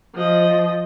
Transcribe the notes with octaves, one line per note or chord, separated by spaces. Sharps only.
F3 D#5